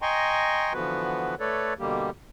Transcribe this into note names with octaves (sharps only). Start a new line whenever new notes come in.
D#5 G5 G#5 A#5 C6 C#6
D3 E3 F3 B3 F#4 B4
A3 A4 B4 C#5 D5
B2 D3 G3 A#3 G4